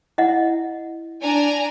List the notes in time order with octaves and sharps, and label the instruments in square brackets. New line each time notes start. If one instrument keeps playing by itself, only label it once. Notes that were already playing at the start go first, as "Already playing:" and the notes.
[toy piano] E4 D#5 F#5
[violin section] D4 G#5 A#5